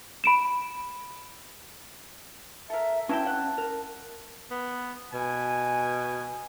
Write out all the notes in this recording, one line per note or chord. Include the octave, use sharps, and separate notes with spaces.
B5 D7 E7
A4 A#4 E5
E3 F#3 C#4 E4 E5 G5 A5
F#5
A#4
B3
B2 G#5